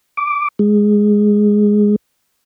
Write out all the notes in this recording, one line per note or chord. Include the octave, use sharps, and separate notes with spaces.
D6
G#3